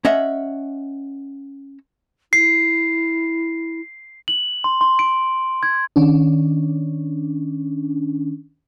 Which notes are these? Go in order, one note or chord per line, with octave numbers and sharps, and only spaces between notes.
C#4 D#5 E5 F#5
E4 C7
F#7
C6
C6
D7
G#6
D#3 C#4 D4